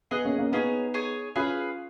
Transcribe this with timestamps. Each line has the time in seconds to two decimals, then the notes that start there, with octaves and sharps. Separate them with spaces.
0.11 B3 G#4 D#5 F#5
0.25 A#3 C#4
0.38 A#3 C#4
0.52 B3 C#4 D#4 G#4 C#5
0.94 G#4 C#5 G#5
1.36 C#4 F4 G#4 B4 F5